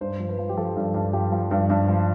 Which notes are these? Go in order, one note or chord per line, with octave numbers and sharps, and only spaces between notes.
G2 C5
F3
B4
F3
G4
F3 A4
G2
G2
F3 G4
F3
G2
G2
F3